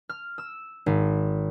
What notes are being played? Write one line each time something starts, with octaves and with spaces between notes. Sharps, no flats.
F6
E6
G#1